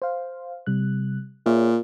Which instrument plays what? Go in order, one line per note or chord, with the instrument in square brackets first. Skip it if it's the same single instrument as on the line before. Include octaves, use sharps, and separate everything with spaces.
[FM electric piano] C5 F5
C3 G3 F#6
[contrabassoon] A#2 [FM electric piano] G#4 C#5 E5